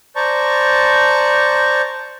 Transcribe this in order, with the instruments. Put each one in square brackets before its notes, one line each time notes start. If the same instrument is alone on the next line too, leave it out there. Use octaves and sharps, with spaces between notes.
[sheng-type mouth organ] C5 D5 A5 A#5 C#6